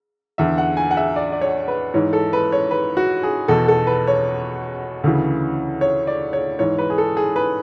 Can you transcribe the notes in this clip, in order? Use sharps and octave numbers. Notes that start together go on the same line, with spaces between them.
E2 D3 E5
F#5
G#5
F#5
E5
D5
D5
C#5
B4
G#2 E3 C#5
A4
B4
C#5
B4
F#4
G#4
E2 B2 A4
A4
B4
C#5
D2 C#3 E3
C#5
D5
C#5
G#2 E3 C#5
B4
G#4
A4
G#4
B4